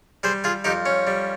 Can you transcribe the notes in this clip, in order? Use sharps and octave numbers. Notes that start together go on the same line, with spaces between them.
G3 G#4 C5
F4 G#4
F2 D#4 G4
C#4
G3